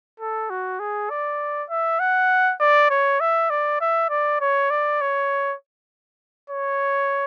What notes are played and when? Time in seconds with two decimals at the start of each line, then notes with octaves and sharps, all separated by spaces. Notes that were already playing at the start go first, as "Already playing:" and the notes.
0.20 A4
0.50 F#4
0.80 G#4
1.10 D5
1.70 E5
2.00 F#5
2.60 D5
2.91 C#5
3.20 E5
3.50 D5
3.81 E5
4.10 D5
4.41 C#5
4.71 D5
5.01 C#5
6.50 C#5